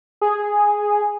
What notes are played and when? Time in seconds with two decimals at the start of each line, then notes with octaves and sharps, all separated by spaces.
0.21 G#4